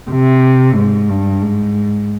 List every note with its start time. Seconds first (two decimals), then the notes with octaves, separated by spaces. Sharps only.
0.11 C3
0.76 G#2
1.09 G2
1.42 G#2